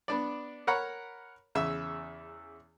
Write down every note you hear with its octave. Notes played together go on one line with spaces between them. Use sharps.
B3 D4 D5
A#4 C#5 F#5 A#5 B5
E2 C#3 E5 E6